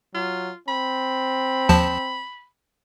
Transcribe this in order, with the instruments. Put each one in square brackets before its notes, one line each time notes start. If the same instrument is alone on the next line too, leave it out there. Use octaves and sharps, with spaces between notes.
[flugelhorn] F#3 [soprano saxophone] F4
[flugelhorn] C4 [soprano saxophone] B5
[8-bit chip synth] D#2 F3 A5